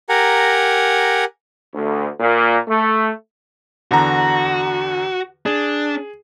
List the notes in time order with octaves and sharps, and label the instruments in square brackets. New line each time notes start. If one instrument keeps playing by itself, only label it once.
[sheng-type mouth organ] G4 A#4 F#5 G#5 A#5
[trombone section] D2
A#2
A3
[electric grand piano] E2 D3 A#5 [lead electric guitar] F#4
[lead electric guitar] D4 [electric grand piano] G#4